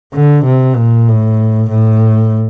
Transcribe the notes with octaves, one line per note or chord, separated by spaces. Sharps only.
D3
C3
A#2
A2
A2